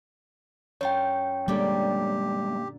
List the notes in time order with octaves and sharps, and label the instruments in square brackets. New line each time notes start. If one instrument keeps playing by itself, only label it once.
[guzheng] F#2 F4 [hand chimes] C#5 G5
[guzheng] A#2 D3 [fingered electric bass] G3 G#3 A#3 [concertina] G4